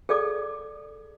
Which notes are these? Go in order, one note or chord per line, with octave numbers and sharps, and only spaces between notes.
G#4 A4 D5 D6